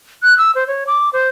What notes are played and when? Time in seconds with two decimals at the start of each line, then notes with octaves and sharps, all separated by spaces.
0.23 F#6
0.38 E6
0.55 C5
0.67 C#5
0.87 D6
1.13 C5